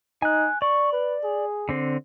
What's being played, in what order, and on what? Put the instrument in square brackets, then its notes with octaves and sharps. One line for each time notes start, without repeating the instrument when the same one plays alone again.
[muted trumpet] D#4 [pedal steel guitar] G#5 F#6
[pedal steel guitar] D5 [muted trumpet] C#6
[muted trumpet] B4
G#4
[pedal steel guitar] D3 C4